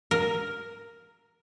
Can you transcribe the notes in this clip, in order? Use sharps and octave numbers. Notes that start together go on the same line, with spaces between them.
A#4